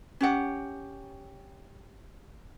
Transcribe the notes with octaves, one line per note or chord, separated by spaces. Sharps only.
C#4 G4 F#5